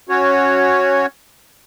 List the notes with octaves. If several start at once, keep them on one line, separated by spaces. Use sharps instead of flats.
C#4 F#4 C#5